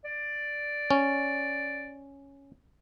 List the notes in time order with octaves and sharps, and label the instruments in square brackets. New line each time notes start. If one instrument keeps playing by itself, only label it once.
[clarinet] D5
[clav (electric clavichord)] C#4